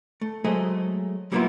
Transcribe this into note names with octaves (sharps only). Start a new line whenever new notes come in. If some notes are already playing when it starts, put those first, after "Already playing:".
A3
F#3 G#3 A3 G#4 C5 D#5
F#3 G3 A#3 B3 E4 F4